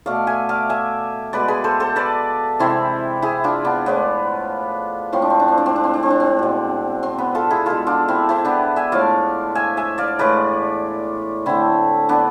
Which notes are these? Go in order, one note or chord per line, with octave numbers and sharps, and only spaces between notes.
B2 A3 D5 F5
E5 G#5
D5 F5
E5 G#5
B2 G#3 B4 D5
G#4 B4
A4 C5
A4 C5
B4 D5
C3 E3 G#3 C4 E4
E4 G#4
D4 F4
B3 D4
A2 F3 G#3 B3
A2 F3 G#3 C4
D4
C4
D4
C4
D4
C4
D4
C4
D4
C4
D4
C4
B2 G#3
C4
B3
F4 A4
E4 G#4
B2 G#3 F4 A4
D4 F4
C4 E4
C4 E4
B3 D4
E5 G#5
A2 F3 G#3 D5 F5
E5 G#5
E5 G#5
D5 F5
A2 E3 G#3 B4 D5
D3 A3 C4 E4
B3 D4